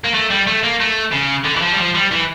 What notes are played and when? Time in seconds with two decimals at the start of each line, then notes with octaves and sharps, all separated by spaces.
0.04 A#3
0.14 A3
0.30 G3
0.47 A3
0.63 A#3
0.80 A3
1.12 C#3
1.45 D3
1.56 E3
1.62 F3
1.73 G3
1.78 F3
1.95 G3
2.12 E3